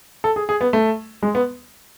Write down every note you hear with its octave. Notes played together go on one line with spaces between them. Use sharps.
A4
G#4
G#4
B3
A3
G#3
B3